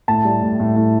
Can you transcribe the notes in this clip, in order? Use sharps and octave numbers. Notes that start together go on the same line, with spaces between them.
A2 A5
G3
A2
A2
A2